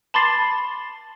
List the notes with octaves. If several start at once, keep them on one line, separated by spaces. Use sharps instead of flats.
A5 B5 C6 D6 A6 C7